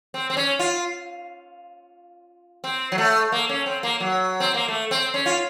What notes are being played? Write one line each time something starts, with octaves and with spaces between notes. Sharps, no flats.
C4
C4
C#4
F4
C4
F#3
A3
A#3
C#4
C4
A#3
F#3
C4
A#3
A3
C4
C#4
F4